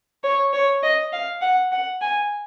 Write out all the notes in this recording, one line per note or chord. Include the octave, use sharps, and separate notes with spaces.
C#5
C#5
D#5
F5
F#5
F#5
G#5